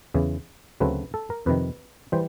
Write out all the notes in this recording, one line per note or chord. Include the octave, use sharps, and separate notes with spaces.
E2 C#3 E3
D2 C#3 F#3 A3 C4 B4
A4
A#4
F2 C3 D#3 B4
E3 G3 C5